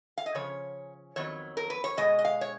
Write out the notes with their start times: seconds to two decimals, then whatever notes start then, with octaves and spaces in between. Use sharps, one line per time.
0.18 F5
0.26 D#5
0.34 C#3 F3 C#4 C#5
1.16 F2 D#3 F#3 B3 C#5
1.57 A#4
1.70 B4
1.84 C#5
1.97 B2 G#3 D#5
2.19 D#5
2.25 F5
2.41 C#5